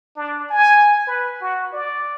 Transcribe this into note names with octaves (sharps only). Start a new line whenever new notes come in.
D4
G#5
B4
F#4
D5